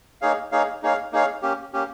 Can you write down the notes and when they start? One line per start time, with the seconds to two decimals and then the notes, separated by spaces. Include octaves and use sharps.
0.22 A#3 D#4 G#4 C#5 F5
0.52 A#3 D#4 G#4 C#5 F5
0.83 A#3 D#4 G#4 C#5 F5
1.12 A#3 D#4 G#4 C#5 F5
1.42 A#3 C#4 G4
1.73 A#3 C#4 G4